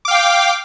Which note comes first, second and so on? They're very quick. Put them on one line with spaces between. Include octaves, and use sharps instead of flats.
D6 F5 G5